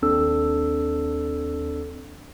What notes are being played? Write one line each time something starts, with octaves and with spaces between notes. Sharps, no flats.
D#2 C4 D4 A4 E6